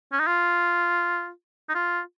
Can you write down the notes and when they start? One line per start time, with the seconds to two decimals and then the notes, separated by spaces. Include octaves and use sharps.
0.12 C#4
0.20 D#4
0.27 F4
1.69 D#4
1.75 F4